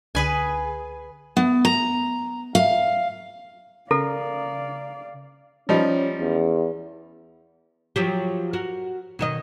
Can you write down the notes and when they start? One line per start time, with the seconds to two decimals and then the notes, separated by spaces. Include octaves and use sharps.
0.15 C#2 D3 G#4 B4 G#5
1.37 B3
1.65 A#5
2.55 F5
3.91 C#3 A4 A#4 D5 F5
5.69 F3 G3 C#4 D#4
6.20 E2
7.96 F3 F#3 G4
8.53 F#4 A#4
9.19 B2 D#3 D#5